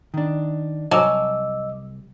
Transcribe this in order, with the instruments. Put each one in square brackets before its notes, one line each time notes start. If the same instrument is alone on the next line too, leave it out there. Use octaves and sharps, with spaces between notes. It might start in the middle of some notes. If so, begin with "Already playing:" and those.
[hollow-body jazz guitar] D#3 D4
[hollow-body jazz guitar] C2 G#5 A5 [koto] F#3 [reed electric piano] D#5 D6 E6